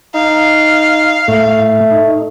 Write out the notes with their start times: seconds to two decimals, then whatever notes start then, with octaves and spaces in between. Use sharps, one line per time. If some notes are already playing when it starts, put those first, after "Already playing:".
0.14 D#4 F5
1.28 A2 A3
1.91 D#4